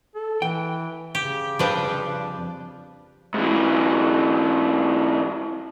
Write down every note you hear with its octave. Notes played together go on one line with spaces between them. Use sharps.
A4
E3 G5
C#3 G4
F2 F3 G3 D4 B4
G#2 E3